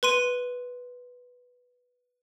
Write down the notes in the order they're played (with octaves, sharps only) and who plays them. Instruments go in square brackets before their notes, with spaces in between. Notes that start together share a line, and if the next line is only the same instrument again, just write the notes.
[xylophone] B4 C6 D#7